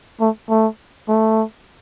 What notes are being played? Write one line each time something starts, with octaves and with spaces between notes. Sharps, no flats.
A3
A3
A3